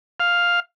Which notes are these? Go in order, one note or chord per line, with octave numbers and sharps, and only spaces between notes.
F5